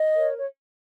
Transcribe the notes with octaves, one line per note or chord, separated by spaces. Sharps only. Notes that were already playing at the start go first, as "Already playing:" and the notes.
Already playing: D#5
A#4 C#5
C#5